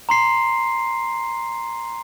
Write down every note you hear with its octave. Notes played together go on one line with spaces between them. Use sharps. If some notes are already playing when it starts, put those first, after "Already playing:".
A#5 C6 C7